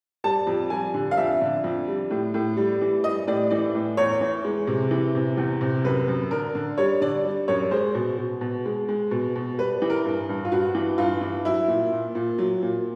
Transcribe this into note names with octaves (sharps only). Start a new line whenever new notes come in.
G3 A5
F2
G3 G#5
D3
F5
F2 E5
D3
F2
G3
A2
A2
G3
E3
G3 D#5
A2 D5
E3 D5
A2
E2 C#5
E3
G#3
C3
E3
C3
E2
C3
F#2 B4
F#2
D3 A#4
D3
G3 C#5
D3 D5
G3
F#2 C#5
G#3 C5
B2
B2
B2
G#3
G#3
B2
B2
G3 B4
E3
A#4
G2
G2
F4
G2 F#4
E3
G2 F4
E3
F#3 E4
A#2
A#2
A#2
F#3
A#2